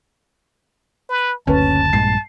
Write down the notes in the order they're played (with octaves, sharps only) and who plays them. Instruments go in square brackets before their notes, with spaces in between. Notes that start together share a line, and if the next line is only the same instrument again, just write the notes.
[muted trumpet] B4
[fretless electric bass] F#1 D2 [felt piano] C#4 B4 [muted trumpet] A5
[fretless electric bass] A#1 G2 G#3 [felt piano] C7